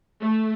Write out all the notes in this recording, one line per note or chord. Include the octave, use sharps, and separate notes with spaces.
A3